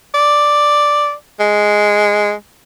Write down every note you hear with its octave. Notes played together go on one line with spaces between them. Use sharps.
D5
G#3